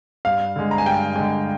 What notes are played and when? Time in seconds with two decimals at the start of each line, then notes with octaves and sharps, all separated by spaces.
0.25 G2 F5
0.56 D3 G#3
0.71 A#5
0.78 G#5
0.86 G2 G5
1.16 D3 G#3 G#5